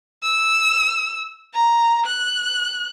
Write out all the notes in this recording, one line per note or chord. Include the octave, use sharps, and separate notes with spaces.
E6
A#5
F#6